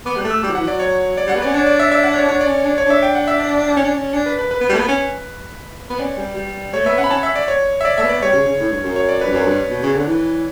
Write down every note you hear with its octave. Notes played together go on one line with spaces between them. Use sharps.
B3 D6
G3 F#6
A3
E6
G3 D6
F#3
E3 F#5
F#3 D5
C#5
D5
G3 F#5
B3
C#4 D5
D4 C#5
D5
E5
E5
F#5
C#5
D4 C#5
D5
C#4
D4
C#5
D4 E5
G5
F#5
E5
D5
C#4
D4
C#4
D4
B4
B4
B4
B3
G3
A3
B3
C#4
B3
C#4 D5
G3
G3
A3 C#5
B3 E5
C#4 F#5
B5
C#4 A5
E5
D5
C#5
E5
D5
A3 E5
B3
D5
G3 C#5
C#3
C#3
A2
G2
F#2
C#5
D5
G2 B4
F#2 C#5
G2
B2
C#3
D3
E3